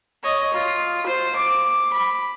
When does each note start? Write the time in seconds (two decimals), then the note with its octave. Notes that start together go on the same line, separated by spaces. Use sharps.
0.23 C#5 D#5
0.54 F4
1.06 C5
1.36 D6
1.93 B5